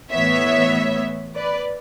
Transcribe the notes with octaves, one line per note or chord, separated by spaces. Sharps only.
A2 E3 B3 C#5 E5
B4 D5